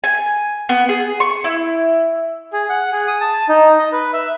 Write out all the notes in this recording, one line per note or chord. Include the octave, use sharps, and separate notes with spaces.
G#5
B3
G#4
C#6
E4
G#4
F#5
G#4
D#6
A5
D#4
D#5
B4
E5